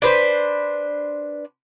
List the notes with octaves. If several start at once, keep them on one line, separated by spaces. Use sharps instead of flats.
D4 B4 C5